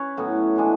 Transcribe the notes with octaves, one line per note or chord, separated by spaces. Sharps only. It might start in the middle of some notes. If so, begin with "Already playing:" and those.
Already playing: C#4 B4 C#5
A2 F#3 B3
E3 G#3 D4